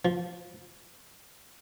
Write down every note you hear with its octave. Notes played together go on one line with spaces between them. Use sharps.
F3